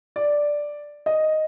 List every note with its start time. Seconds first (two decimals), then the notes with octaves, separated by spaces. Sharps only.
0.16 D5
1.06 D#5